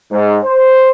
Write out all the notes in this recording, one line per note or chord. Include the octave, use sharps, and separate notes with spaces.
G#2
C5